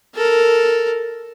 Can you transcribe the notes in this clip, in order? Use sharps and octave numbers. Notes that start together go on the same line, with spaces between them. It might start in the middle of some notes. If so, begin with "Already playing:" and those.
A4 A#4